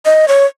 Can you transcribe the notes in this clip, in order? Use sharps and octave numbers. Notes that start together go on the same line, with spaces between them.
D#5
C#5